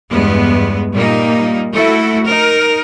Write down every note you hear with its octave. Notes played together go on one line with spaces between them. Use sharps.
E2 G2 G#3 B3
A#2 G3 A#3 D#4
A3 E4 F#4 A4
D#4 A#4